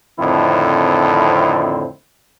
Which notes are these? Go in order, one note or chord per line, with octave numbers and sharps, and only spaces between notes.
F2 A2 D3 D#3 C4 E4